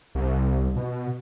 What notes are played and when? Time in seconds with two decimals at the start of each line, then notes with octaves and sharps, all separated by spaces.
0.15 C2
0.76 B2